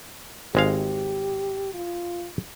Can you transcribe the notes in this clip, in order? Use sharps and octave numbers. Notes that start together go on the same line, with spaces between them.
G#1 G#3 G4 F5
F4